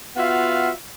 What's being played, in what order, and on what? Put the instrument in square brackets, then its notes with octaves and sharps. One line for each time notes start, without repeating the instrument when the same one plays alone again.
[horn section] B3 F4 F#4 E5 F5